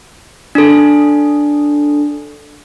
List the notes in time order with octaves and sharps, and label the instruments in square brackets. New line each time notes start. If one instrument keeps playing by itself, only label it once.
[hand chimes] D4 A4